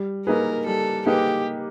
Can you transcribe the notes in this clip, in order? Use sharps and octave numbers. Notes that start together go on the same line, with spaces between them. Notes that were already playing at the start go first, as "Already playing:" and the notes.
Already playing: G3
A#3 D#4 G#4 A#4 B4
G3 A4
A#3 D#4 G4 G#4 B4